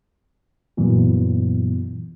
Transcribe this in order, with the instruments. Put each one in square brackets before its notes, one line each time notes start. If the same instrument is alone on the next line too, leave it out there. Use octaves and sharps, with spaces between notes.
[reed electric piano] F#2 A#2 E3 F#3 B3